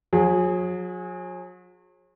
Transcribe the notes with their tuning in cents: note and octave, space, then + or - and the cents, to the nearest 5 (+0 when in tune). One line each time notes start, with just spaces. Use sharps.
F#3 -40 G#4 +0